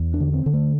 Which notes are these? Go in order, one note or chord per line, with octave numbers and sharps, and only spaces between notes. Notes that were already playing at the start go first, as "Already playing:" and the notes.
Already playing: E2
D4
D3
C4
D3
A3